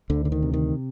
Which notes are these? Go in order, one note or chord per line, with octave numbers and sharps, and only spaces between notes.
D2 D3
D3
D#3
C3
D#3